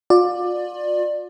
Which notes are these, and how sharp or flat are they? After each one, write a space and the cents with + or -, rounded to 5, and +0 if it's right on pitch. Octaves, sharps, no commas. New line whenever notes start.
F4 +35 D5 +15